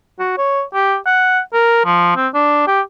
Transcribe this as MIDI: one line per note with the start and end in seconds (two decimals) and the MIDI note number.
0.19 0.37 66
0.38 0.62 73
0.74 0.96 67
1.06 1.40 78
1.53 1.85 70
1.85 2.16 53
2.16 2.28 60
2.34 2.65 62
2.67 2.81 67